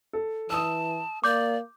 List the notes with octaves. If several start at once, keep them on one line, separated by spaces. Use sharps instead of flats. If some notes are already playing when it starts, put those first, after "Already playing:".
A4
E3 A5 D#6 E6
A#3 D5 D6 G6